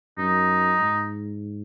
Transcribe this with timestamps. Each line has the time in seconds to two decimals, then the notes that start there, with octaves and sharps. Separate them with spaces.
0.18 F#2 D#4
0.80 G#2